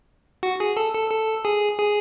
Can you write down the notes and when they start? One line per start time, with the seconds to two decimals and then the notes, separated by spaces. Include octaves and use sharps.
0.43 F#4
0.60 G#4
0.77 A4
0.94 A4
1.11 A4
1.45 G#4
1.79 G#4